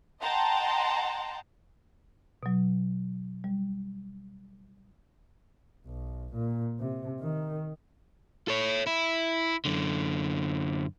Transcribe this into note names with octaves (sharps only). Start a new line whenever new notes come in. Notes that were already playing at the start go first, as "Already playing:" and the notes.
D#5 F#5 G5 A5 A#5 C6
B2 F#3
G3
B1
A#2
C3
D#3
A4 C#5
E4
F#2 D3